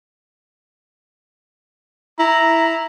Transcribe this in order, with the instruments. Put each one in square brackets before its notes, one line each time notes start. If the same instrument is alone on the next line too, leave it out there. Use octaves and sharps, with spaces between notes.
[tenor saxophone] E4 [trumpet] A#5